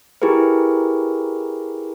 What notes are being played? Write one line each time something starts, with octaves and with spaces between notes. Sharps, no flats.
E4 G4 G#4 A#4 B4